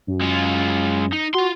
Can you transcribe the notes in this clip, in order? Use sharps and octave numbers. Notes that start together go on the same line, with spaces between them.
F#2
G#3 F4
D#4
F4 F#4 C6